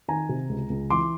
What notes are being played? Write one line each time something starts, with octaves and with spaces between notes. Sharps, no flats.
D#3 G#5 A#5
C3
C#2
C#2
E3 C6 D6